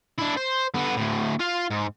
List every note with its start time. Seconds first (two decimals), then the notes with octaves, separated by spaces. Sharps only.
0.18 D4 E4
0.37 C5
0.74 D3 B3
0.96 D2 A2
1.39 F4 F5
1.70 G#2